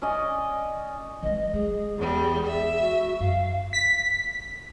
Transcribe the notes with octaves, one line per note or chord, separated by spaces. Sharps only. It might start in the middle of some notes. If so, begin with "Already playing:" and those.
C#4 D5 D#5
E3 G#3 D#5
G#3 G#4
E2 G3
E5
F#4
F#2 F5
B6